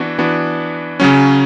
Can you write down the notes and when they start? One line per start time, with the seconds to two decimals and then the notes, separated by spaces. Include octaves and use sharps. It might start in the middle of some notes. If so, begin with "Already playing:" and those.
Already playing: E3 B3 D4 F#4
0.18 E3 B3 D4 F#4
1.00 C#3 F#3 C#4